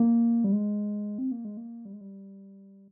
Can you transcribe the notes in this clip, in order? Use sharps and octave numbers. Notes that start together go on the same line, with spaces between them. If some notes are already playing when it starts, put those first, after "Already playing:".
Already playing: A#3
G3
G#3
C4
A#3
G#3
A#3
G3
G#3
G3